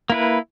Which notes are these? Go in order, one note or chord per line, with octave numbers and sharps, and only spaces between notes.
A#3 E4 B4